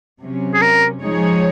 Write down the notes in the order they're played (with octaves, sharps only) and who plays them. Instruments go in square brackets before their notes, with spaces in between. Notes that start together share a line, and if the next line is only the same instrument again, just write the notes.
[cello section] C3 F#3 C#4
[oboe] G#4
A#4
[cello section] F3 G#3 D#4 G#4 C#5